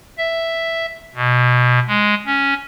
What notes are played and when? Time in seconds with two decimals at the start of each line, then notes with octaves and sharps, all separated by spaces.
0.18 E5
1.15 B2
1.88 G#3
2.26 C#4